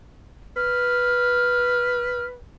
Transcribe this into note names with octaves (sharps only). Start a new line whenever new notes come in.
B4 F6